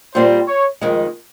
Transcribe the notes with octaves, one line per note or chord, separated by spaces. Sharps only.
A#2 G3 C4 C5
C#5
F2 D#3 G#3